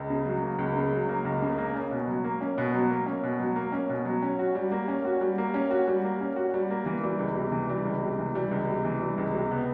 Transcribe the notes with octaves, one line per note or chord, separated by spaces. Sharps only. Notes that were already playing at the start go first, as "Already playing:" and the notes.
Already playing: C#2
C#3
F#3
A#3
C#2
C#3
F#3
A#3
C#2
C#3
A#3
C#4
B2
F#3
A#3
C#4
B2
F#3
A#3
C#4
B2
F#3
A#3
C#4
B2
F#3
C#4
F#4
G3
A#3
C#4
F#4
G3
A#3
C#4
F#4
G3
A#3
C#4
F#4
G3
A#3
E3
G3
C#2
C3
E3
G3
C#2
C3
E3
G3
C#2
C3
E3
G3
C#2
C3
B3